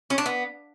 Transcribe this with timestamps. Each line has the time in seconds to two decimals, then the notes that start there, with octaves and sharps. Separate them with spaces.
0.10 C#4
0.18 D4
0.26 B3